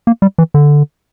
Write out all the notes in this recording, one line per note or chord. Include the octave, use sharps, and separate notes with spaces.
A#3
G3
E3
D3